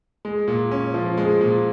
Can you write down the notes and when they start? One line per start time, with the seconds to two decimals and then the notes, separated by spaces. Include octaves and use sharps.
0.25 G#3
0.48 A#2
0.71 C#4
0.94 F3
1.18 G#3
1.41 A#2